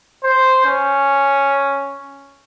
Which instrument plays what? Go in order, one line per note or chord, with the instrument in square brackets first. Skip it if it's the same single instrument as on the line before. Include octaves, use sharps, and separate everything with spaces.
[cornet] C5
C#4